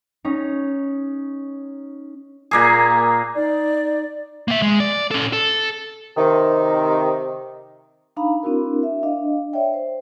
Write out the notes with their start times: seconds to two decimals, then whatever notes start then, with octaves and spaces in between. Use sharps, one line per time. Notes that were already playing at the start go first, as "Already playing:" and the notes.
0.25 C#4 D#4
2.51 A#2 A#3 G#4
3.35 D#4 D5
4.48 A#3 E5
4.62 G#3
4.80 D5
5.11 C#4 A4
5.33 A4
6.17 C3 D#3
8.16 D4 D#4 F5 A#5 B5
8.43 C4 D4 E4 F#4 A#4
8.83 E5
9.03 D4 D#5 F5
9.53 C#5 D5 E5 G5
9.74 C5